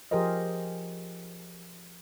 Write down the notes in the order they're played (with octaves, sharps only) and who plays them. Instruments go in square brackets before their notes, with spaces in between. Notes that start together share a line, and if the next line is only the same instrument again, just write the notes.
[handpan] F3 G4 G#4 A#4 C5 D#5